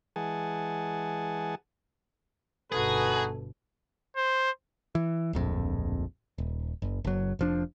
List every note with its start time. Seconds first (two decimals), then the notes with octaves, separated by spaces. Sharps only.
0.16 E3 G#3 G#4 F#5 G#5 A5
2.72 G1 B2 D#4 F#4 G#4 A4 B4
4.17 C5
4.95 E3
5.33 D1 A#1 F2
6.38 D#1
6.82 F#1
7.05 F#1 F#3
7.39 F1 F3 D4